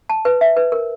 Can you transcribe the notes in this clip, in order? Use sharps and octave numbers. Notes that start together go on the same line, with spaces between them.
A5
B4
E5
B4
A#4